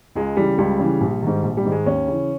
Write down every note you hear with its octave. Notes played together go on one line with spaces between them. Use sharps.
C#2 G#3
C#3 E3 G3
C#2 G3
C#3 E3
A#1
G#2 D#3
A#1
G3
G#2 D#3
G#3
D#2 C#4
C#3 E3